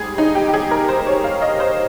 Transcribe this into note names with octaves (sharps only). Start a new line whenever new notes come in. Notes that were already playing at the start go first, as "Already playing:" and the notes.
Already playing: G#2 G3 G#4
D#4
G4
G4
G#4
A#4
C5
C#5
F5
D#5
C5